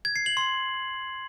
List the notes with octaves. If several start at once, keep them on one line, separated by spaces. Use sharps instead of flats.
G#6
C7
F#7
C6